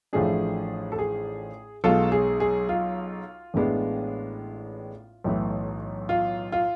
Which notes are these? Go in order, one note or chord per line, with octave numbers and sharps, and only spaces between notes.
A1 A2 F3 A3 D4 G#4
A4
G#4
B1 B2 G#3 F4 A4
G#4
G#4
F4
A1 A2 G#3 B3 D4
B1 A2 E3 A3
F4
F4